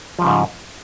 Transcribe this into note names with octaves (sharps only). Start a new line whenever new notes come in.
G#2 C#3 F3 G3